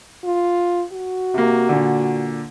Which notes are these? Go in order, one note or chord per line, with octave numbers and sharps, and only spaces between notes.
F4
F#4
C3 A#3
A#2 D3